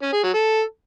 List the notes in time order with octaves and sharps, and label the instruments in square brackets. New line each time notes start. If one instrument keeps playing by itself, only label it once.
[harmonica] C#4
G#4
F#3
A4